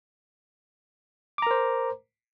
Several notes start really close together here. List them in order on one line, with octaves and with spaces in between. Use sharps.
D6 A#5 A#4 C5